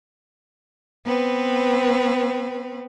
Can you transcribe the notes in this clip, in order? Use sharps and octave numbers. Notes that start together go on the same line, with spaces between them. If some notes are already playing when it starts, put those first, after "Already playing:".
B3 C4 B4